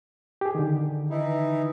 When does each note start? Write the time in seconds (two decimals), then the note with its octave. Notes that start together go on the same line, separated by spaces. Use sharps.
0.41 G4 G#4
0.55 D3 D#3
1.10 E3 D#4 E4